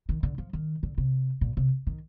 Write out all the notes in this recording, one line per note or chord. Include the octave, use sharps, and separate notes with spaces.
D#3
D3
F3
D#3
D3
C3
A#2
C3
D#3